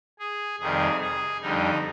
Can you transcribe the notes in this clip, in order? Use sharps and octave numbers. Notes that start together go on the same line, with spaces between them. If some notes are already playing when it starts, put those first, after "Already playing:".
G#4
F2 C3 D#3 G3 G#4
G#4
F2 D3 G3 D#4